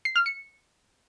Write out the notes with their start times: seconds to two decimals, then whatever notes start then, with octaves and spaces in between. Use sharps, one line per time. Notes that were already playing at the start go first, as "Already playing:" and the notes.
0.05 C7
0.16 F6
0.26 C#7